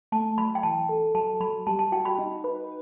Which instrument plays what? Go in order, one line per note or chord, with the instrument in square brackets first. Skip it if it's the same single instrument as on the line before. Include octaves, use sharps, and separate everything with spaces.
[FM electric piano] A3 [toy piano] A5
[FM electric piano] F#3 [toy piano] B5
[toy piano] G5
[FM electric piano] E3 [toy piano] A5
[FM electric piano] A4
[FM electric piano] F#3 [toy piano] A5
[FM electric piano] F#3 [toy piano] B5
[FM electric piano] G3 [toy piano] A5
[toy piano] A5
[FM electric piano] F#4 [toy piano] G5
[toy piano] B5
[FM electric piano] D#4
B4